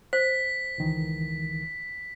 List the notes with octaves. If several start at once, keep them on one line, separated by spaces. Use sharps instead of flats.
C5 B6
C#2 D#3 E3